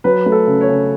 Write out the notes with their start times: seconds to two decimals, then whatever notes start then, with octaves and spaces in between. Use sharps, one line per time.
0.04 F#3 B4
0.26 A3
0.32 A4
0.47 C#3
0.61 C#5
0.68 C#3